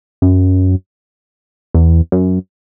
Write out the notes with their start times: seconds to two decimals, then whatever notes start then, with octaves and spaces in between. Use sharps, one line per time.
0.22 F#2
1.74 E2
2.12 F#2